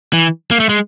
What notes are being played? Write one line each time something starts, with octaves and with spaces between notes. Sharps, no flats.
E3
A#3
A3
G#3